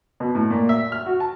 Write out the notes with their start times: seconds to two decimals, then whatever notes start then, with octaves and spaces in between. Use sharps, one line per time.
0.20 B2
0.35 A2
0.50 A#2
0.69 E5
0.92 F6
1.06 F#4
1.20 A5